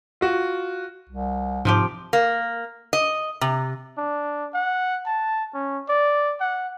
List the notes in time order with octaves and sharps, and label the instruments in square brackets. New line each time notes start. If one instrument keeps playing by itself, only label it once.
[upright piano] F4 F#4
[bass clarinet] C2
[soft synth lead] G#2 [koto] C3 F3 G4
[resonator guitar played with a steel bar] A#3
D#5
C3
[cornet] D4
F#5
A5
C#4
D5
F#5